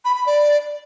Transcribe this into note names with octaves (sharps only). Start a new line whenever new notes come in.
B5
B5
D5